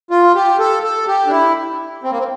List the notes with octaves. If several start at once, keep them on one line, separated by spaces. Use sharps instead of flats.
F4
G4
A4
A4
G4
D4
E4
C4
A#3
C4